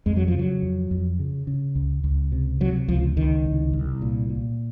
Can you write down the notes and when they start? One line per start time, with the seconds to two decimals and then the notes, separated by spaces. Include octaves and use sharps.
0.06 F2 G#3
0.16 F#3
0.28 F3
0.34 C#3
0.39 F#3
0.62 F2
0.91 F2
1.19 C#3
1.47 C#3
1.75 C#2
2.04 C#2
2.32 C3
2.60 C3 F#3
2.88 C#2 F3
3.16 C#2 D#3
3.45 C2
3.73 C2
4.02 A#2
4.30 A#2